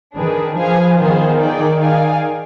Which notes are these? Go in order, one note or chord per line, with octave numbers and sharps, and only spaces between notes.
D#3 D4 G#4 B4
F3 G#4 B4 F5 G#5
D#3 B3 F4 G#4 C5 F5
G#4 D5 G5
G#4 D5 F5 G#5